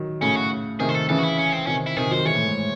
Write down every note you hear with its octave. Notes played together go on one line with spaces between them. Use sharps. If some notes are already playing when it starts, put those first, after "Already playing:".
Already playing: D#3 F#3
A2 C#3 C#4
F#4
C3 D#3 G#4
C5
A4
C#3 E3 A4
F#4
E4
C#4
C4
C3 D#3 C#4
E4
C3 D#3 G#4
D#3 F#3 C5
E3 G#3 C#5
A2
G#2